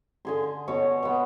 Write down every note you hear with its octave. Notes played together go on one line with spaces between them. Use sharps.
D3 G#4 C6
B2 C#5
B2 B3